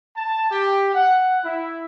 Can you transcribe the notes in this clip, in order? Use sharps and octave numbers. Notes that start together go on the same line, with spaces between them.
A5
G4
F#5
E4